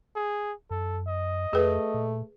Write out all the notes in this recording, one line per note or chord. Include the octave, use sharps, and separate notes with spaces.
G#4
F#2 A4
D#5
F2 A3 G#4 B4
A#2